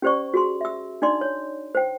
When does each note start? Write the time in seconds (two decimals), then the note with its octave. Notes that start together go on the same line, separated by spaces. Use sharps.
0.02 C#4 G4 C5 D5 C#6
0.34 F#4 G#4 C6
0.61 E5 E6
1.02 D4 D#4 D5 C6
1.21 C#5
1.75 C5 G5